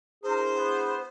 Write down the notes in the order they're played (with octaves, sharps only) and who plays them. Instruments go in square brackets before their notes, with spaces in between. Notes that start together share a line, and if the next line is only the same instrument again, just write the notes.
[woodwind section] D4 E4 G#4 [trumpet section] A#4 [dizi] C5
[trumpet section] B3